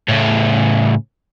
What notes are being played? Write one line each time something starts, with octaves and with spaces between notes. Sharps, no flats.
A2 C#3